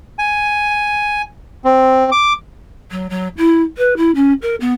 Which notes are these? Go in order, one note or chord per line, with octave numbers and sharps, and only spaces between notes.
G#5
C4
D6
F#3
F#3
E4
B4
E4
C#4
A#4
B3